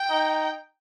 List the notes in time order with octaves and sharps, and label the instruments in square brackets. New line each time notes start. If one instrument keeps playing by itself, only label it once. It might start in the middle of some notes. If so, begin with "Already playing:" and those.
Already playing: [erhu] G5
[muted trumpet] D#4